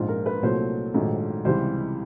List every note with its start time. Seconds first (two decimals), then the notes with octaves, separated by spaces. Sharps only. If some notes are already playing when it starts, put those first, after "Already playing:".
Already playing: A#1 G#2 F3 F4
0.08 A#4
0.26 B4
0.42 C2 A#2 F#3 A3 C5
0.94 A#1 G#2 D#3 F#3 A3
1.45 C#2 C3 E3 G3 C5